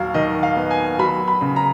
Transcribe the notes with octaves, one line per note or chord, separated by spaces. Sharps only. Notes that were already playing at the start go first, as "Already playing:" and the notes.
Already playing: D#2 F#3 F5
D#3 D#5
F5
B3
G#5
F#3 B5
B5
C#3
A#5